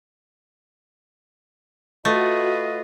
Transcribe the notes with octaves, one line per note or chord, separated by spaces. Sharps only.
A3 F4 F#4 B4 D#5